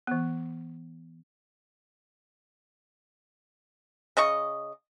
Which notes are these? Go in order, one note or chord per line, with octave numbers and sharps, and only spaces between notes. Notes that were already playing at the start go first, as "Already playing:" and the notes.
E3 B3
C#3 D#5 C#6